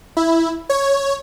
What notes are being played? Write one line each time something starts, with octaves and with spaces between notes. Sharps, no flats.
E4
C#5